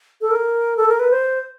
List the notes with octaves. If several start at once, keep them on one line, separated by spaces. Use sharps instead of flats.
A4
A#4
A4
A#4
B4
C5